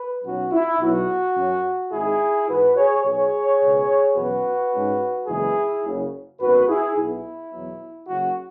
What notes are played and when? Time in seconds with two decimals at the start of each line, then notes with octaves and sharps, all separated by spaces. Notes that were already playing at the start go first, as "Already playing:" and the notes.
Already playing: B4
0.23 B1 B2 F#3 C#4 F#4
0.52 E4
0.79 B1 B2 F#3 F#4
1.35 F#2 F#3 C#4
1.92 G#1 G#2 G#3 E4 G#4
2.47 G#2 E3 G#3 F#4 B4
2.76 G#4 C#5
3.04 B1 B2 B3 G#4 C#5
3.60 C#2 B2 B3
4.15 E2 B2 F#3 C#4 F#4 B4
4.72 G#2 G#3 C#4
5.27 F#1 E2 E3 G#3 B3 E4 G#4
5.84 F#1 F#2 C#3 F#3
6.40 G#1 F#2 F#3 B3 F#4 B4
6.68 E4 G#4
6.96 B1 B2 B3 E4
7.51 E2 B2 F#3 B3
8.08 F#1 F#2 C#3 F#3 F#4